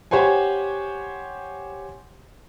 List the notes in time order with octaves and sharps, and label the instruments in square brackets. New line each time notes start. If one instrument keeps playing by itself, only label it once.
[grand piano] G4 C5 C#5 F#5 G#5